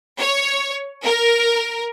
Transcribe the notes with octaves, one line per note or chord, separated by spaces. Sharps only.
C#5
A#4